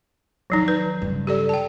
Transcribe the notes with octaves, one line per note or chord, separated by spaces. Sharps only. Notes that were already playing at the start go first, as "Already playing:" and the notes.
E2 D#3 F3 F#3 D#4
B4
G2 C#3
G4 A4 D5
G5 A5